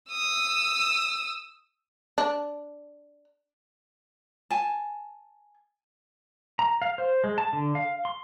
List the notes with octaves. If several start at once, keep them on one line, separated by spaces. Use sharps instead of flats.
D#6 E6
D4
G#5 A5
A#5
F5
C5
G#3
A5
D3
F5
C6